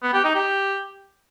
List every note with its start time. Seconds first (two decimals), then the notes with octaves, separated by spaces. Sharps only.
0.03 B3
0.13 G4
0.24 D#4
0.35 G4